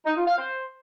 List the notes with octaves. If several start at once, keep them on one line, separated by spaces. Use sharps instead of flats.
D#4
F4
F5
C5